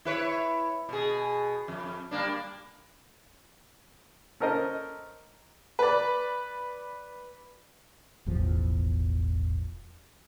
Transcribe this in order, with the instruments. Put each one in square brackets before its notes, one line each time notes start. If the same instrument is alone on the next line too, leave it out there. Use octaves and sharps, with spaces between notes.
[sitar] E4 B4 C#5
B2 G#4
F2
G3 A#3 D4
[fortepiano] C#4 A4 A#4 C5 D#5
[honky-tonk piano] B4 D5
[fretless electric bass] E1 A1 E2 F3